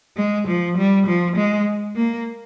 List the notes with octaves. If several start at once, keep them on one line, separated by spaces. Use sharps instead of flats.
G#3
F3
G3
F3
G#3
A#3